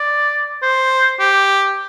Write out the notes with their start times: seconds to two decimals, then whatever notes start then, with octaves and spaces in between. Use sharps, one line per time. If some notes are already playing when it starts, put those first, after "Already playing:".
Already playing: D5
0.62 C5
1.19 G4